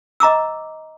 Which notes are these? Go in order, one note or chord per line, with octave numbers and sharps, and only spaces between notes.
D#5 A#5 D6 E6